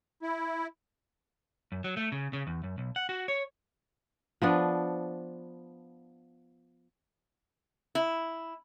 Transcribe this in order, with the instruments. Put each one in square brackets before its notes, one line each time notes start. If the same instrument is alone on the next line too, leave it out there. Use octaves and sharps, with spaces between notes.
[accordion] E4
[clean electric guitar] F#2
F#3
A3
C#3
C#3
E2
F#2
B1
F#5
F#4
C#5
[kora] F3 B3 D4
[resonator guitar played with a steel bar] E4